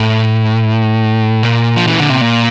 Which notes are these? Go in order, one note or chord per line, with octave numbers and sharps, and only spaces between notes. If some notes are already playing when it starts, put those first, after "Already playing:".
Already playing: A2
A#2
F3
E3
D3
C3
A#2